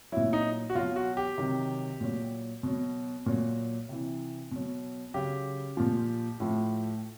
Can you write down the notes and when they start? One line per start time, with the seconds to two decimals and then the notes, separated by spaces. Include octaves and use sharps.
0.12 A#2 F#3 E4
0.33 D#4
0.70 F#4
0.75 B2 F#3 F4
0.96 F#4
1.17 G4
1.38 C3 D#3 F#3
2.01 A#2 F#3
2.63 B2 F#3
3.26 A#2 F#3
3.89 C3 E3
4.51 B2 F#3
5.14 C#3 F#3 G4
5.77 A#2 F3
6.40 A2 F3